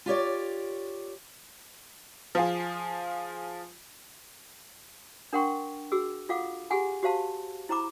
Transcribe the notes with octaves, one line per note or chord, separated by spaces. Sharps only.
F4 G4 C#5 D5
F3 F4 G#4
D4 A#4 F#5 G5 C6 C#6
F#4 G#4 E6
F4 A4 F5 F#5 D6
G4 G#4 F#5 G#5 B5
F#4 G4 C5 F5 A5 C6
E4 C5 A#5 B5 D6